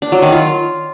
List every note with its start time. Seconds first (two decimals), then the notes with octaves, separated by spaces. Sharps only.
0.02 D4
0.12 F#3
0.22 D#3
0.32 F4